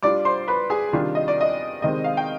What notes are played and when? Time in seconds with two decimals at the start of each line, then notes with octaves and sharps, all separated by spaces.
0.03 G3 D4 F4 D5 D6
0.25 C5 C6
0.48 B4 B5
0.70 G#4 G#5
0.93 C3 D#3 G3 D4 F4
1.15 D#5
1.28 D5
1.41 D#5
1.82 C3 D#3 G#3 C4 D#5
2.04 F5
2.17 G5